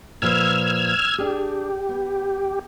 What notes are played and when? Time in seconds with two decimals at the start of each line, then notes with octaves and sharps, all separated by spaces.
0.22 A#2 F3 B4 E6 F6 G#6
1.18 D4 G4 G#4
1.89 B3